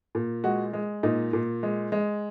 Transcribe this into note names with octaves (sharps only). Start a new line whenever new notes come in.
A#2
G#3 F#4
G#3
A#2 D#4
A#2
G#3
G#3